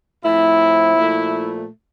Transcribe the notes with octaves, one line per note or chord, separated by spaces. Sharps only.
A2 F3 C4 E4
A#2 F3 A3